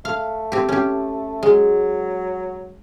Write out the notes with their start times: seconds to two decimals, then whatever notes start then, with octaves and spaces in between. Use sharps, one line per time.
0.05 A3 F5
0.52 C4 G4
0.69 C#4 G4
1.43 F#3 G#3